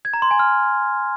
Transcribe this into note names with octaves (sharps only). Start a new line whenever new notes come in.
G#6
A#5
C6
G#5
F6